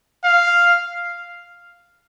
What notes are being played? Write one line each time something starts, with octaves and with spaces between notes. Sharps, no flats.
F5